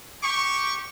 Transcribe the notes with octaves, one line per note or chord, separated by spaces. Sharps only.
G4 C#6